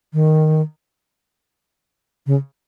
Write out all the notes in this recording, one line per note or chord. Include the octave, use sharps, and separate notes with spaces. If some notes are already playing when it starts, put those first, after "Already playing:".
D#3
C#3